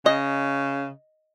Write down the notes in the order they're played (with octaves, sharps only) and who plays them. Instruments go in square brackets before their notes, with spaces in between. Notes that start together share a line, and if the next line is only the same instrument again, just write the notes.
[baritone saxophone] C#3 [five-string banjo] D#5